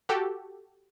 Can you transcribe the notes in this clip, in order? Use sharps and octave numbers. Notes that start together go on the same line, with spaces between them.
F#4 G4 A4